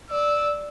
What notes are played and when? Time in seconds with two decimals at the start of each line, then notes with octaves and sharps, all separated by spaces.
0.11 D5 E6